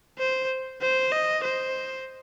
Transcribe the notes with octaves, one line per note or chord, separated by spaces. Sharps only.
C5
C5
D#5
C5